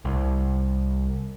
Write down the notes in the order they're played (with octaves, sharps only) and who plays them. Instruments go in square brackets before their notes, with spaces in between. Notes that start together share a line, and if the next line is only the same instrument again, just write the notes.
[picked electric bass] C2